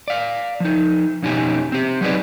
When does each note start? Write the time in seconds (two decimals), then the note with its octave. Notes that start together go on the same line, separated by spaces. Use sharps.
0.08 D5 F5
0.60 F3 D#4
1.22 F2 B2 C#4 D#4 G4 G#5
1.72 C4 G4
2.01 F#3 A3 D#4 G#4 B4 D5